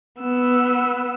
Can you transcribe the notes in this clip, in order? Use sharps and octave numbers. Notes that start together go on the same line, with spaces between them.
B3 E6